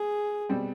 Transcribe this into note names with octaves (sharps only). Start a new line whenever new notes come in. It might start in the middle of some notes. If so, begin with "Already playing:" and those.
Already playing: G#4
B2 G3 C4